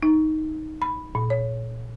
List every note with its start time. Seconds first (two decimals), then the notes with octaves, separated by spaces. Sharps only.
0.03 D#4
0.82 B5
1.15 A#2
1.30 C#5